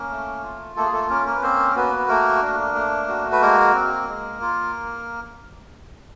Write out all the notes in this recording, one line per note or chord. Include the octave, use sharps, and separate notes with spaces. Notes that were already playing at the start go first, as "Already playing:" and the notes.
Already playing: A#3 C#4 A#4
A3
F4
A3 A#3 A4
G#4
A3 A4
A#3 C#4 A#4
A#3 A#4
B4
A#3 C4 C5
A#4
B3 F#4 B4
B4
A3 A#3 A#4
D4
A3
F#4
B4
G#3 A#3 A#4
C4
G#3
F4